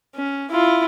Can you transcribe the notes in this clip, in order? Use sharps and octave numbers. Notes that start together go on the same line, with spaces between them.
C#4
E4 F4